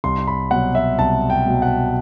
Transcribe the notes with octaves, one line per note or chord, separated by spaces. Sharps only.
C2 C6
B5
B2 F#3 F#5
E5
C2 A5
G5
B2 F#3
F#5